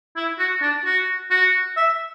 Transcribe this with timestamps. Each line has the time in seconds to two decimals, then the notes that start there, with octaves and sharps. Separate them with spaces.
0.16 E4
0.39 F#4
0.62 D4
0.85 F#4
1.31 F#4
1.77 E5